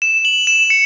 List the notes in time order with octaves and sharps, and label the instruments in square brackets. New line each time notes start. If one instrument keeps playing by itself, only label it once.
[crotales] E7
F#7
E7
C#7